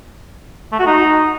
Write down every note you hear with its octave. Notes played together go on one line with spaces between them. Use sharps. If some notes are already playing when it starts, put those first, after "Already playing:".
A3
F#4
D#4